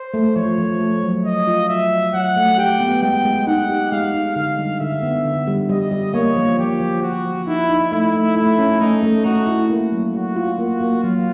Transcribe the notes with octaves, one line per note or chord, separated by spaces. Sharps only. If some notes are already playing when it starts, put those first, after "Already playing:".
Already playing: C5
A3
F3 C#5
F3
A3
F#3
F#3 D#5
F4
F#3 E5
F#3
F#3 F#5
A3
G4 G5
B3
G#3 G5
G#3
D#4 F#5
G4
G#3 F5
D#4
D3 F5
G3
D3 E5
B3
D3
G3
G3 D#5
G3
A#3 C#5
F3
F3 G4
F3
F3 F#4
F3
D#4 E4
D#4
A3 E4
A3
A3 E4
C#4
A3 D#4
A3
A3 F#4
E4
A#3
F#3
F#3 F#4
F4
A#3 F#4
A#3
F#3 F4